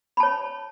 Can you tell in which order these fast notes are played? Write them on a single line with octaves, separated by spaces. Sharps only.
B5 A5 C#5